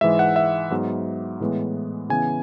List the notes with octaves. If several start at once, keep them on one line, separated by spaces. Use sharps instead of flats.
G#2 E3 G#3 E5
F#5
E5
G#2 F#3 B3
A2 E3 G#3 B3
C#3 E3 B3 G#5